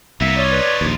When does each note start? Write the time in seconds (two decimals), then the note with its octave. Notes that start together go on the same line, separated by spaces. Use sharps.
0.21 C2 A#3 B3 E5
0.37 D#4 F4 C#5 D5
0.52 B4
0.81 A#1 D#2